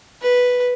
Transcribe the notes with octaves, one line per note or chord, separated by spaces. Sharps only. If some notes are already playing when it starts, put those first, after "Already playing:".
B4